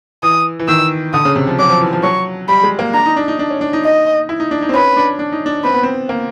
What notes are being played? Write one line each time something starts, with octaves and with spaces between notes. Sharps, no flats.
E3 D#6
E3
D#3 E6
D3 D#6
C#3
C3
F3
F#3 D6
F3
E3
F3
F#3 C#6
G3 B5
G#3
A#3
D4 A#5
D#4
D4
D#4
D4
C#4
D4
D#4
D#5
E4
D#4
D4
D#4
C4
C#4 B4
D4
D4
D#4
D4
C4 B4
B3
C4
A#3